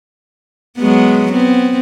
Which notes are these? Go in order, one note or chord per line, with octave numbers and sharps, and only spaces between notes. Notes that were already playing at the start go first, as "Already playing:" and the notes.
F#3 G#3 B3
B3 C4